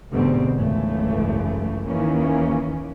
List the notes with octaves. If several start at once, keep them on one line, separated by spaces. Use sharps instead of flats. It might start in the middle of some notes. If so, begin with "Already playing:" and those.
D2 G#2 B2 D3 G3 C4
G#1 C#2 F#2 E3 A3
D#2 D#3 E3 A#3 C#4